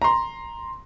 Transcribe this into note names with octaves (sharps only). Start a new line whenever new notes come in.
A#5 C6